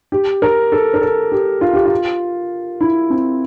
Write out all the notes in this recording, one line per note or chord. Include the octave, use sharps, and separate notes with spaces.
G4
A#4
A4
A#4
A4
G4
F4
G4
F4
E4
C4